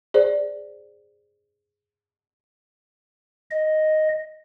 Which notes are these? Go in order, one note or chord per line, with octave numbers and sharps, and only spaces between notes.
G#4 C5 D5
D#5